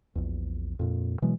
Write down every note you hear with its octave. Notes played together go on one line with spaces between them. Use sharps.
A#1 E2
F2 A#2
B2 E3 F#3 G#3